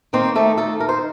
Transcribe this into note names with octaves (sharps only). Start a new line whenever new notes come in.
D#3 A#3 C4 D#4 C5
A3 A4
A3 A4
A#4
C5